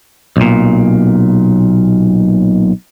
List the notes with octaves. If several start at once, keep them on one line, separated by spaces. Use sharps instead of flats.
B1 A#2